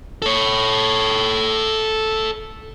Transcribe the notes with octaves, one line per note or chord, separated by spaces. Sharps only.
A4 C#5